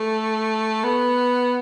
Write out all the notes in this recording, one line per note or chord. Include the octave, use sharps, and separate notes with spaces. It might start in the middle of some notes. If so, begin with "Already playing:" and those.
Already playing: A3
B3